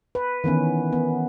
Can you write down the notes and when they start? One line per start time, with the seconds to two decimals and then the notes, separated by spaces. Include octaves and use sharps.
0.15 B4
0.44 D#3 E3 B3 C#4
0.93 B3